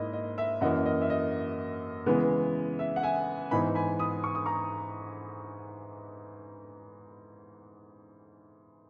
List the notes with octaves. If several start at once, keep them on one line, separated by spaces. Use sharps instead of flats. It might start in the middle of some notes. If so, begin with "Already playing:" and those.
Already playing: G#2 A#3 E4 D#5
D#5
E5
F#2 E3 A#3 D#5 F#5
D#5
E5
D#5
C#3 E3 G#3 B3
E5
F#5
E5 G#5
G#2 E3 B3 D#4 G#5 B5
G#5 B5
B5 D#6
C#6
D#6
A#5 C#6